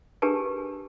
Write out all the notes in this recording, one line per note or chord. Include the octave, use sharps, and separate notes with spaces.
D4 G4 G#4 A#4 B4 A5